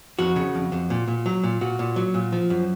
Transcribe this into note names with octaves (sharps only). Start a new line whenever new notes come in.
F2 F#4
C#3
F2
F2
A#2
A#2
F#3
A#2
A#2 F#4
A#2
F#3
A#2
F3
F#2